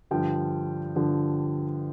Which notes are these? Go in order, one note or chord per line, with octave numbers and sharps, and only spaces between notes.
G2 D3 F3 G5
G2 D3 F3